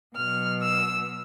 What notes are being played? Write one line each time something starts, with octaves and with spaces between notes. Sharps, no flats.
B2 F#3 F6
E6